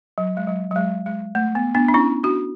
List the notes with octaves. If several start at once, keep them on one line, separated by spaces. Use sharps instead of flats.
F#3
G#3
F#3
F#3
G#3
G#3
A3
B3
B3 D4
D4
C#4 E4
D4 F#4